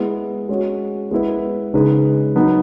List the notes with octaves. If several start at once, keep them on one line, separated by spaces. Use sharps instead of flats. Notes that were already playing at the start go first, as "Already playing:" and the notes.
Already playing: G#3 B3 E4 B4
G#3 C#4 F#4
G#3 B3 E4 B4
C#3 G#3 D#4 G#4 B4
F#3 B3 D#4